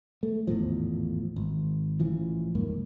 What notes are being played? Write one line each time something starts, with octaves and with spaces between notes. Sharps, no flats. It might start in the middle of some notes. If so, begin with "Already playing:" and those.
A3
G#1 E2 A2 F3
G#1
A1 E3 F3
C2 F2 G#2 A#3